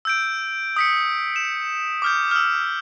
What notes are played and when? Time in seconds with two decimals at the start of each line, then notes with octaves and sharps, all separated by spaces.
0.05 E6 G6 D7
0.76 D#6 B6 C#7
1.36 E7
2.02 D6 F6 G6
2.31 E6 F6